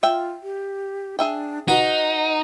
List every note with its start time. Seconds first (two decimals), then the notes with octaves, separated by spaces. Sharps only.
0.03 F4 E5 G5
0.43 G4
1.19 D4 G#4 E5 G5
1.68 D#4 F#4 B4 D#5